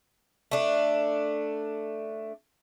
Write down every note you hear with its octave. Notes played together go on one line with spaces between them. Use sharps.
A3 D4